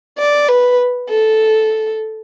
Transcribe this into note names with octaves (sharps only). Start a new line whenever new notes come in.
D5
B4
A4